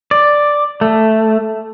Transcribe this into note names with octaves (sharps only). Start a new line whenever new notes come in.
D5
A3